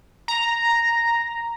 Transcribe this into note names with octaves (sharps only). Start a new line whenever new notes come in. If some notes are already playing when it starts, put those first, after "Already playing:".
A#5